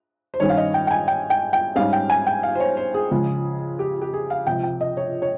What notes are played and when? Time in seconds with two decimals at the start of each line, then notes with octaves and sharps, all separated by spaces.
0.34 C5
0.40 G2 D#3 G3 C#4 C#5
0.49 F5
0.57 D#5
0.74 G5
0.87 G5
0.91 G#5
1.08 G5
1.30 G5
1.53 G5
1.76 G#2 G3 C#4 F5
1.93 G5
2.10 G#5
2.27 G5
2.43 F5
2.55 C5
2.60 C#5
2.77 C5
2.94 G#4
3.11 C#2 C#3 F3 G#3
3.79 G4
4.02 G4
4.13 G#4
4.30 F5
4.47 C#2 C3 F3 G5
4.63 G5
4.81 D#5
4.97 C#5
5.22 C#5